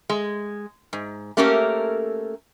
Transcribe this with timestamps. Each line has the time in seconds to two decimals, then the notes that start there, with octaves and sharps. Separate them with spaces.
0.10 G#3
0.93 G#2
1.37 A3 A#3 C#4 G4 A4 A#4